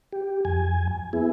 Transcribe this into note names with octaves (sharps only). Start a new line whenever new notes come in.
G4
F2 G#5
B3 E4 G#4